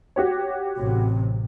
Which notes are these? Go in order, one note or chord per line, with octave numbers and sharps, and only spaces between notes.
F#4 G4 C#5
A1 C3